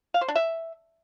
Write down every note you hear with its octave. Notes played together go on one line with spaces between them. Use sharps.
F5
C5
D4
E5